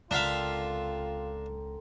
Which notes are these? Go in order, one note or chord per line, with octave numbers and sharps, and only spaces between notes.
C#2 D3 C4 D4 F4 A#4 E5 F5